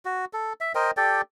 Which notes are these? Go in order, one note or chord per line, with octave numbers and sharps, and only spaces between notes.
F#4
A4
E5
A#4 C5 D#5 G5
G4 A4 D5 G5